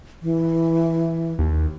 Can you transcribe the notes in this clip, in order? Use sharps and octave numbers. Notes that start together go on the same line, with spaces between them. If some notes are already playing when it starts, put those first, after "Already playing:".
E3
D#2